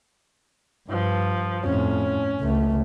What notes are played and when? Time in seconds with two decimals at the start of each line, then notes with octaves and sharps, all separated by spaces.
0.90 G2 F3
1.66 F2 A2 C#4
2.41 C#2 A3